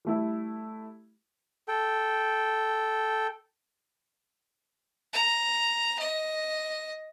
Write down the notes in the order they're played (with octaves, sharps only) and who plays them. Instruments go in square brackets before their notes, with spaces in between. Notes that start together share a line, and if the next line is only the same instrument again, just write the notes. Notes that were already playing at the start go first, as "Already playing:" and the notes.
[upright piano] G3 A3 E4
[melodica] A4 G5
[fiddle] A#5
D#5